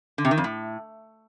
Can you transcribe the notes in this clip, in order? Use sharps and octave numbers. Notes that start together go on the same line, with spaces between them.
D3
C3
D#3
F2
A2